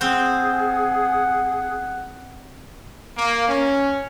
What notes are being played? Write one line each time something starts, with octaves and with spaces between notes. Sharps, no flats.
C4 G#4 C5 F#5
A#3
C#4